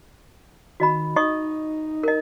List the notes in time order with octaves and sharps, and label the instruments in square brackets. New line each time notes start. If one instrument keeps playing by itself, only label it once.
[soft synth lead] D#3 [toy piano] F#4 D#5 B5
[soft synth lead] D#4 [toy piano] D#5 C#6 D#6
[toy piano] A#4 D#5